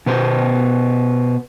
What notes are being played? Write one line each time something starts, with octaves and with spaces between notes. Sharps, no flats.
B2 B3 C5